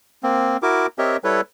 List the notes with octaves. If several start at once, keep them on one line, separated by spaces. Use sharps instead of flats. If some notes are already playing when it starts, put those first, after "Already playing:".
A#3 C4
E4 F#4 A#4 D6
C4 G4 A#4 C#5 D#5 E5
G3 E4 A4 B4 C#5